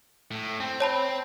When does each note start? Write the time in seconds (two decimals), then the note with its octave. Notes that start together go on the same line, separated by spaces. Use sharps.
0.31 A2
0.60 C4
0.80 C#5 A5 B5